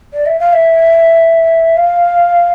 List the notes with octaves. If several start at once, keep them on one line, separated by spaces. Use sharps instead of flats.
D5
E5
F5
E5
F5